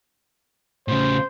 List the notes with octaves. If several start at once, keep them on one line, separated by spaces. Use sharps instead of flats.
A2 C#3 C5